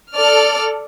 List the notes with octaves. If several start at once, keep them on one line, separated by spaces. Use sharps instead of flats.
A4 D5 F6